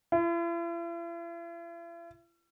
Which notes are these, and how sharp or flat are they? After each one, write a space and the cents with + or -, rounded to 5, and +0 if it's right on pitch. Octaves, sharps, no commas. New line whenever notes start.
E4 +45